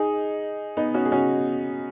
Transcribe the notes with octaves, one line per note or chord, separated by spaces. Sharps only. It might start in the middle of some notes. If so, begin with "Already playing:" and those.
Already playing: D#4 G#4
B3 D#4
C#4 F#4
G#4
C#4 F#4